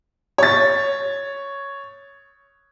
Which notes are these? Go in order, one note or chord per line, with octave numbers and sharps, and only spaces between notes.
C#5 A6